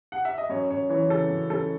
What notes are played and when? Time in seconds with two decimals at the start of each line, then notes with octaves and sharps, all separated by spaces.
0.12 F#5
0.25 E5
0.38 D#5
0.49 F#2 C#5
0.70 F#2 C#5
0.89 E3 C#5
1.09 C#3 A4
1.30 F#2
1.50 F#2 A4